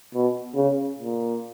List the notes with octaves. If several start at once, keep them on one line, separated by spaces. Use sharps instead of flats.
B2
C#3
A#2